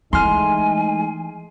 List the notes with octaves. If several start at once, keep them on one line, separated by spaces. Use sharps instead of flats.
E3 G#3 A3 D#4 G#5 C6 F6